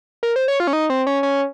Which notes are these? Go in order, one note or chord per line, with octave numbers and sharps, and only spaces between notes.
A#4
C5
C#5
F4
C#4
D#4
C4
C#4
C#4